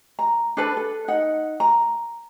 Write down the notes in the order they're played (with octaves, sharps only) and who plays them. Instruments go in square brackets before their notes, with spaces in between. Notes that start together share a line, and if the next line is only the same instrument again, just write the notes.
[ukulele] A#5
D4 A4 B4 B5
A4
D#4 F#5
A#5